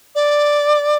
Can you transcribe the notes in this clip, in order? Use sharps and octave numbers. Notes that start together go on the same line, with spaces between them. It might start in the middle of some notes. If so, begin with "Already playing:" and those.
D5